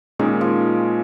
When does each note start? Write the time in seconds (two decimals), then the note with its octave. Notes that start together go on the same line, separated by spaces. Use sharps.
0.19 A#2 D#3 G#3 C#4 G#4
0.41 F3